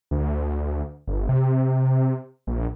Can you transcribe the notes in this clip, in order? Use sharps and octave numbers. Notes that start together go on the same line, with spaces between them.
D2
G1
C3
A#1